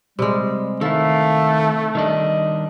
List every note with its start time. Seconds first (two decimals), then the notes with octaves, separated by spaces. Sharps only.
0.19 C3 G3 G#3
0.81 D#3 A3 E4 A4 F5
1.95 D#3 G3 D4 D#5